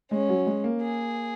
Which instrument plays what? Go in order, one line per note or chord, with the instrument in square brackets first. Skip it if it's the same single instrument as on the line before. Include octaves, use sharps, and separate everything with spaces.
[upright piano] G#3 [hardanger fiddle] C#4
[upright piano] F#3
G#3
A#3
[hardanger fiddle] G#4